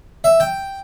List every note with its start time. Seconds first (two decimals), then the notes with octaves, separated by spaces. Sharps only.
0.24 E5
0.40 G5